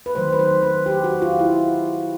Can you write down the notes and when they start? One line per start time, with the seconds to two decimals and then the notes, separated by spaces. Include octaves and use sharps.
0.06 B4
0.15 D#3 F#3 A3 C5
0.32 B4
0.39 C5
0.63 B4
0.86 G4
1.04 F#4
1.22 F4
1.39 E4